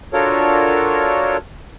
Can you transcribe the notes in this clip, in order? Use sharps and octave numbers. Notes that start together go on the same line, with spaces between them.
D4 F4 F#4 A4 A#4 C#5